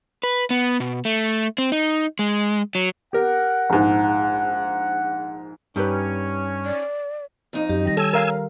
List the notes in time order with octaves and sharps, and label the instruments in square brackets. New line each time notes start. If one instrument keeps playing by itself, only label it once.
[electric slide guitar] B4
B3
B2
A3
C4
D#4
G#3
F#3
[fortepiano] G4 A#4 [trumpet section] F#5
[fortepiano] A#1 G#2
[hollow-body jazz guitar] G2 [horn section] C#4 [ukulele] D#4 G4 B4
[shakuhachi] D5
[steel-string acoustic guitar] F2 D#4
[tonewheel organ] F#2 [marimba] G4
[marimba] D#3 G3 A#6
[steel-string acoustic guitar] C#4 [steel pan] A4 [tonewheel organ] G#5 E6
[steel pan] A#4 F5